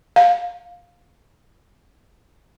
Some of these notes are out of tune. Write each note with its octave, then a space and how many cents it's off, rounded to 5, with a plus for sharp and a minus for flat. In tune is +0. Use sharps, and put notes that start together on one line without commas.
F5 +10